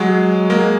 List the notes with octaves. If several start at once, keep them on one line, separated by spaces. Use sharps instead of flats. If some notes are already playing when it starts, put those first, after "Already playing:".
Already playing: F#3 G#3
G#3 A#3